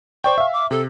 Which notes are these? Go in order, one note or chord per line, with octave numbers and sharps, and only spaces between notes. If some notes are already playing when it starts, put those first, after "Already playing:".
C5 D5 G5 C#6
E5 F5
D6
C3 A4